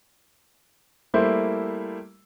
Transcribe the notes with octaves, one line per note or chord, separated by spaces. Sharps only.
G3 A3 A#3 E4 C5